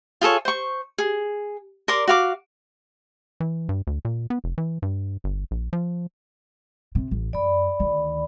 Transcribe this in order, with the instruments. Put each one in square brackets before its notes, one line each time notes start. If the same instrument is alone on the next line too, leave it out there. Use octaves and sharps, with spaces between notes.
[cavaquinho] F4 G#4 A4 C#5
C5 C#6
G#4
A#4 D5 C6 D6
F#4 F5 D6
[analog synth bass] E3
G2
D2
A#2
B3
F1
E3
G2
G1
A#1
F3
[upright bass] C3
A1
[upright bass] F#2 [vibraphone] D5 B5
[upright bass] D2 D#3